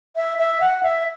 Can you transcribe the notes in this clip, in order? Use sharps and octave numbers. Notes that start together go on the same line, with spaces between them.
E5
E5
F#5
E5